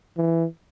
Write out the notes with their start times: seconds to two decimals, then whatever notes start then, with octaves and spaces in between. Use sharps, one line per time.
0.17 E3